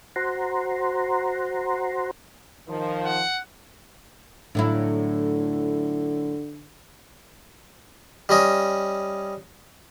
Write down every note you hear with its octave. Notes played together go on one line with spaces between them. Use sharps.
F#4 C5 F#5 A#5 C6
D#3 F3
F#5
A2 D3 F#3 E4
G3 C#4 D#5